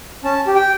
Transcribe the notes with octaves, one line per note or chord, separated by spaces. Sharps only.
C#4 A5
G4
G5